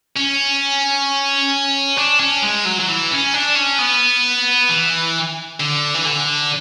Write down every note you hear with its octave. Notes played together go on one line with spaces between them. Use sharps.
C#4
D4
C#4
G#3
F#3
F#3
E3
C#4
D4
C#4
B3
E3
D3
E3
D3